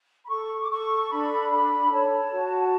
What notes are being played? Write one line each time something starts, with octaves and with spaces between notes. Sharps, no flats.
B5
A4 C#6
D6
A4 C#6
D4 B5
A4 B5
C#5 A5
F#4